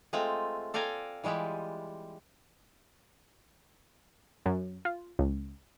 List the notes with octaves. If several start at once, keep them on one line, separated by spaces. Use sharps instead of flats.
G#3 A3 C4 F4
A4 D5 F5 G5 G#5 A#5
E3 G3 G#3 F4 G4
F#2
F4
C#2